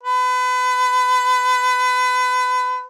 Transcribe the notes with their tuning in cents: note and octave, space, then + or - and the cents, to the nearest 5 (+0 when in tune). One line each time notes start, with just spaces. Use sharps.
B4 +30